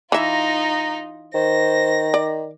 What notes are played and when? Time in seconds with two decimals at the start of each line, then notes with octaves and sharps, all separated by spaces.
0.12 E3 D#4 F4 E5 A#5
1.34 D#3 C5 A#6
2.14 D5